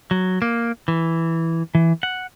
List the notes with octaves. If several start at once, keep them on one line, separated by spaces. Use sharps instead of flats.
F#3
A#3
E3
E3
F#5